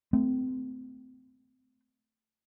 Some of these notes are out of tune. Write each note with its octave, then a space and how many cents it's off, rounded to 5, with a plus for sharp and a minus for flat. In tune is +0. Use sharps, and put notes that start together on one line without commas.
A3 +0 C4 -30